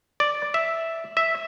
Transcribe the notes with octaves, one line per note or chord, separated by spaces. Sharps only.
D5
E5
E5